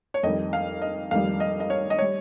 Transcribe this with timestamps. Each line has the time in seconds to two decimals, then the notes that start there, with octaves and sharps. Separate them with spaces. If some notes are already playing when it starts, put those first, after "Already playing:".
0.14 C#5
0.23 F2 D#3 G3 D#5
0.53 F5
0.82 D#5
1.11 F2 D#3 G3 F5
1.40 D#5
1.60 D#5
1.70 C#5
1.90 D#5
1.99 G3 C#5